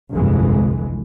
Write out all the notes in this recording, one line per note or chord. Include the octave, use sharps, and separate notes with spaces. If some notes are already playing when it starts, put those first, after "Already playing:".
G1 C2 F2 E3 G#3